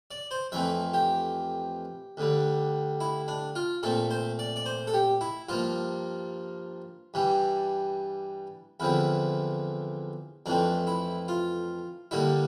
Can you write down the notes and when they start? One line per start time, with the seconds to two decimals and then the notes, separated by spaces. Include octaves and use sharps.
0.11 D5
0.31 C5
0.52 F2 E3 A3 C4 E5
0.94 G4
2.17 D2 D3 G3
3.00 E4
3.28 D4
3.56 F4
3.83 A#2 A3 C4 A4
4.11 C5
4.39 D5
4.56 D5
4.66 C5
4.87 A4
4.94 G4
5.21 E4
5.49 G2 F3 A#3 F4
7.14 G2 E3 G3
8.80 E2 D3 F3 C4 E4
10.46 F2 E3 A3 C4 D4
10.87 E4
11.28 F4
12.11 G2 D3 G3 A#3 E4